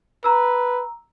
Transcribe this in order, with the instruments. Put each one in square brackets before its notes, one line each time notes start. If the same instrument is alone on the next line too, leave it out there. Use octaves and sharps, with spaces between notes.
[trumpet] B4 [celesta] A#5 E6